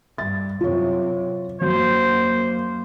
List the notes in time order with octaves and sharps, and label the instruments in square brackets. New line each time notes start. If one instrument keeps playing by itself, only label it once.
[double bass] G2 [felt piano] A6
[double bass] F#2 C3 [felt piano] F4 C#5
[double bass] F#2 A#3 [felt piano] F#3 [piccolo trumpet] C5